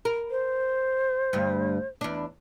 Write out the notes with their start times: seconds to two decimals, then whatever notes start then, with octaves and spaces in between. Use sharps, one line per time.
0.05 A#4
0.30 C5
1.33 D2 G2
2.01 E2 D4